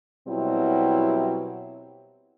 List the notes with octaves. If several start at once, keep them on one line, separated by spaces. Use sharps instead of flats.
B2 F#3 G3 C4 E4